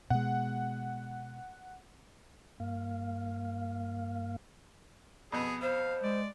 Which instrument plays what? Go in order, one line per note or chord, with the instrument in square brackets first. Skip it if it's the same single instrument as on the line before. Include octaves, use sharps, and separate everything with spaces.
[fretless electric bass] B2 G#3 [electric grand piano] F#5
[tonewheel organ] G2 A#3 F5
[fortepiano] F2 B2 B3 [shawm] G#4
[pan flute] C5 [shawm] F5
[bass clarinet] G#3 [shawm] D5